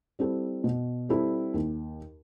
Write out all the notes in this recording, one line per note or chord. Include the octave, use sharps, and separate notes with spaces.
G3 C4 E4 A4
B2
G3 C4 E4 A4
D#2